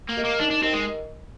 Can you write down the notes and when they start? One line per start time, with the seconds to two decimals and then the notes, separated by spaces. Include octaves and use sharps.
0.09 A#3
0.17 G4 A#4 D#5
0.25 A#3
0.39 D4 D#4
0.51 D4
0.62 C4 G4 A#4 D#5
0.74 G#3